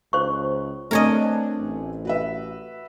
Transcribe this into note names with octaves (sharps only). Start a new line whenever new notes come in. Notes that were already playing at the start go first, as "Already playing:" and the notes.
C#2 C5 C#6
A3 C4 D4 A#4 C#5 D#5 G#5
A1
F#4 B4 E5